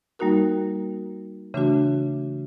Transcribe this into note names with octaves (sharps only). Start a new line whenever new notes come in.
G3 A#3 D#4 F#4 A#4
C#3 E3 A3 D4 F#4